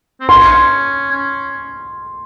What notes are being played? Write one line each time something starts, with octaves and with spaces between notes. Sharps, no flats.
C4
C#4 C6
C#4